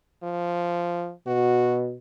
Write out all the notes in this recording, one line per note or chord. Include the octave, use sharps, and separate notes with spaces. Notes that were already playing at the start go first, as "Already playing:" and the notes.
F3
B2 F#4